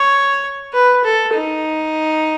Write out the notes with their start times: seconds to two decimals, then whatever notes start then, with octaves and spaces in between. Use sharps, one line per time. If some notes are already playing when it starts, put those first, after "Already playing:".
Already playing: C#5
0.74 B4
1.04 A4
1.34 D#4